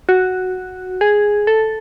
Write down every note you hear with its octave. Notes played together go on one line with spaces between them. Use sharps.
F#4
G#4
A4